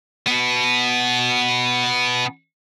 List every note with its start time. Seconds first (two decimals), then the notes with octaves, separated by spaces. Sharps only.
0.27 B2 B3